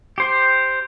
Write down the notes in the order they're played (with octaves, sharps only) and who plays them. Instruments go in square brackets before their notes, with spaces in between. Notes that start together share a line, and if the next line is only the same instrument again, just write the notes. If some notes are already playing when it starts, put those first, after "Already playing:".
[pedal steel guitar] G4 C5